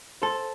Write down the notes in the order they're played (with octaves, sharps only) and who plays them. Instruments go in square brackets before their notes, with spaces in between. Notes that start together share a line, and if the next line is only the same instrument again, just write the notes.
[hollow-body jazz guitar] A4 [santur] C5